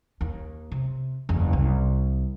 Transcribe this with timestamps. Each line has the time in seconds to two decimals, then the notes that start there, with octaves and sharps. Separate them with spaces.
0.21 D#2
0.72 C3
1.29 F#1 E2
1.53 C2